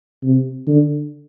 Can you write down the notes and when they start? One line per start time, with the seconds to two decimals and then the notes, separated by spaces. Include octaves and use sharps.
0.23 C3
0.67 D3